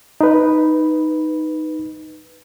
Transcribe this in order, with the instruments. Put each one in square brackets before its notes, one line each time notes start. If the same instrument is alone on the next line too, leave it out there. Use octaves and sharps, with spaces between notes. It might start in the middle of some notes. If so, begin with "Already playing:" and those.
[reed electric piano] D#4 B4